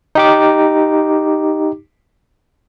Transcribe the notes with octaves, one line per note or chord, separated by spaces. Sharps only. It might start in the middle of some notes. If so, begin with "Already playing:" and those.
D#4 G4 D6